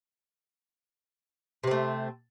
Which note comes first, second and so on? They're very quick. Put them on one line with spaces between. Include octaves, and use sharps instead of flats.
C3 C4 A3